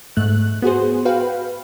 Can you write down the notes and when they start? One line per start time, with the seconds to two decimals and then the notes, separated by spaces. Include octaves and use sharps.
0.17 G#2 A3 F#6
0.62 B3 F#4 G#4 C5
1.05 F#4 B4 F5 G5